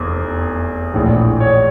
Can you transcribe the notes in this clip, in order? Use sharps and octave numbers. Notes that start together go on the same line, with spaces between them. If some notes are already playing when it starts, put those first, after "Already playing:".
Already playing: F1 E2
A#1 A2 E3
C#5